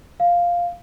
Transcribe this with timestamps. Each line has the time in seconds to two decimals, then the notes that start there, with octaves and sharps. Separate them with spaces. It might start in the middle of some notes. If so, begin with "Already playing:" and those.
0.20 F5